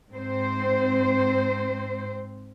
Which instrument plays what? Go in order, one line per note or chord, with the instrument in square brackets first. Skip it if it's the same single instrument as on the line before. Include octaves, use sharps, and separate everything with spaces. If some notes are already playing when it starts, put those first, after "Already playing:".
[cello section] G#2 C4 C5